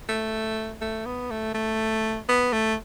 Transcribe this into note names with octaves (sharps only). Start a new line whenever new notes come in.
A3
A3
B3
A3
A3
B3
A3